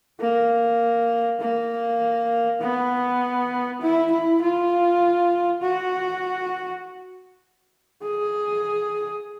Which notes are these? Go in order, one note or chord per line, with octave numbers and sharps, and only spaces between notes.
A#3
A#3
B3
E4
E4
F4
F#4
G#4